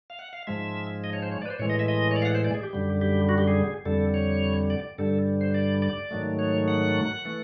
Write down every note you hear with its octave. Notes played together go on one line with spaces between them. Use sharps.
F5
F#5
F5
G#2 F3 G#3 E5
D#5
C#5
C5
C#5
D5
B4
C5
A2 E3 G#3 C#5
D#5
E5
D#5
C#5
D5
F5
F#5
C5
D5
G#4
G4
F#2 D3 G3
G4
F#4
G4
G#4
F2 D3 G3 A4
C#5
D5
G2 D3 G3 A4
C5
D5
D5
G#2 D#3 F#3 A3
C#5
F#5
E3 A3